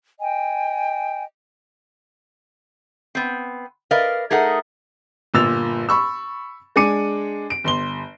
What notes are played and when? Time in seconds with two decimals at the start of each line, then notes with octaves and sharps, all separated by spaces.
0.19 D#5 G5 G#5
3.15 B3 C4
3.91 A#4 B4 D5 D#5 F5
4.31 A3 D#4 G#4 A#4 F#5
5.34 G1 A#2 E6 A6 F7
5.89 B5 C#6 E6
6.76 G#3 D4 G#5 D6 C#7 D#7
7.50 D7
7.64 G1 C6 G7